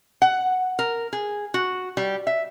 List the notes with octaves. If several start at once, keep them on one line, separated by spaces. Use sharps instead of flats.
F#5
A#4
G#4
F#4
G3
E5